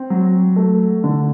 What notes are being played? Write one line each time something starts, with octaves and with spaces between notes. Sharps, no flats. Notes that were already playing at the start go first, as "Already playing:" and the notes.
Already playing: C4
F#3
A3
D3